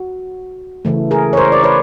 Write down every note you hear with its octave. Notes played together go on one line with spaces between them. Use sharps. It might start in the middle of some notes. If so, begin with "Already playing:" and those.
Already playing: F#4
C#3 E3 A3
G#4 A#4
C#5
A#4 C5
D5
B4 C#5